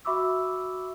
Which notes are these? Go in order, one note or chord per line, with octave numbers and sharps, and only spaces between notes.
F#4 E5 B5 C#6 D6 E6